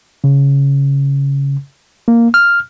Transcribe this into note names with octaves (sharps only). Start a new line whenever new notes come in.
C#3
A#3
F6